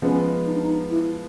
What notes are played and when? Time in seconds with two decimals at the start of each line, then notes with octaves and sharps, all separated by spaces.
0.02 F3 G#3 B3 C#4
0.46 D#4
0.54 D4
0.62 D#4
0.90 E4